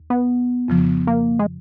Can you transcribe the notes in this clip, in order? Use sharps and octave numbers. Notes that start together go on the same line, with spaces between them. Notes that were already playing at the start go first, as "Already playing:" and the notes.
Already playing: D#2
B3
F2 C#3 F3
A#3
G#3